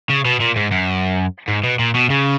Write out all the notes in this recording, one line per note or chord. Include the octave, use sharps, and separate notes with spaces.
C#3
B2
A#2
G#2
F#2
G#2
B2
A#2
B2
C#3